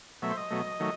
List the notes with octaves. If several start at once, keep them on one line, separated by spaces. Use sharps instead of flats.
B2 F#3 A3 E5
C5
D#5
B2 F#3 A3
D#3 F#3 A3